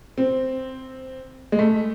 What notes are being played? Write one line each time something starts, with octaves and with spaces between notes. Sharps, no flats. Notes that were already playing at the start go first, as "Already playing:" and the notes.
C4
G#3
A3